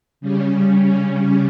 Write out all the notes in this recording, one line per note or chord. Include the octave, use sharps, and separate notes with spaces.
C#3 G3 C#4